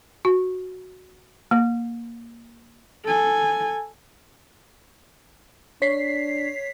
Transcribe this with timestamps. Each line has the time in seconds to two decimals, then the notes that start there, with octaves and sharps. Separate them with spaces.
0.25 F#4
1.51 A#3
3.05 A4 G#5
5.82 D4 C#5 B6 C7